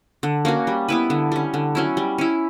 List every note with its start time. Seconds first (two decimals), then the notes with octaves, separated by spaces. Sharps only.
0.23 D3
0.45 A#3 C#4 F#4
0.67 G3
0.89 B3 E4 B4
1.10 D3
1.32 G3 C#4
1.54 D3
1.75 F#3 C#4 E4
1.97 G3
2.18 C#4 E4